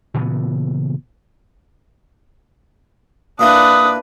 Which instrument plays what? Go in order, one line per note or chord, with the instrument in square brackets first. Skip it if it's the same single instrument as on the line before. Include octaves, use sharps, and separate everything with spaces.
[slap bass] A#2 C#3 E3 B3
[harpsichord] A#2 A#3 E4 [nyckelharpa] D4 B4 [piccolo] D#6